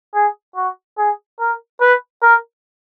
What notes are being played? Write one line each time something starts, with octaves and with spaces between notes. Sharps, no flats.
G#4
F#4
G#4
A#4
B4
A#4